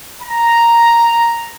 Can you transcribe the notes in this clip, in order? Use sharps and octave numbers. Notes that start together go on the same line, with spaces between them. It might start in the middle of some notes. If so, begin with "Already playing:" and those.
A#5